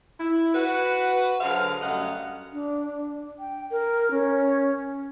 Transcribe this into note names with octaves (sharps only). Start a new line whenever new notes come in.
E4
F#4 B4
D3 F#3 G#4 C5 F5
F#2 G3 A3 D#5 F5 F#5
D4
G5
A#4
C#4